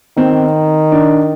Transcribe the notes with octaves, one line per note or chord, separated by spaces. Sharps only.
D#3 C4
D4